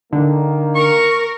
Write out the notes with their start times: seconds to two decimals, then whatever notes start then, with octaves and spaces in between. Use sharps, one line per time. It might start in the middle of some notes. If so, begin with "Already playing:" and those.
0.13 D3 D#3 A#3
0.75 A#4 C#6